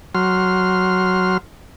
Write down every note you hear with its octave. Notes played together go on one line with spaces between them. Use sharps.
F#3 C6 F6